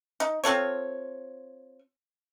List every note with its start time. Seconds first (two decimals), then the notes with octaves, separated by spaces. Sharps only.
0.20 D#4
0.44 C4 F4 A4 C#5